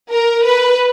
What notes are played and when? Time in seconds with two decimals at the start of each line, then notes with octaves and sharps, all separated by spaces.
0.10 A#4
0.44 B4